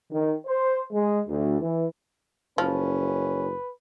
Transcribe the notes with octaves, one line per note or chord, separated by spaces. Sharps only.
D#3
C5
G#3
D2
E3
F#1 F3 C#4 B4